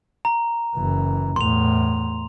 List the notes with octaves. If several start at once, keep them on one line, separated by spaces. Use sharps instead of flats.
A#5
F#1 E3
E2 A2 C6 F7